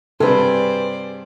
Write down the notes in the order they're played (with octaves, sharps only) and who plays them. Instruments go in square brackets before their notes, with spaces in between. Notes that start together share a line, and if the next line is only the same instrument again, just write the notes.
[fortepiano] G2 C3 [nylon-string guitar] G#4 B4 [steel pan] A4 [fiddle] C5 D5